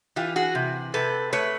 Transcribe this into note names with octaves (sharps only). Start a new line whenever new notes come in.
E3 F4 G4
F#4 G#4
C3
C3 A4 B4
A3 B4 C#5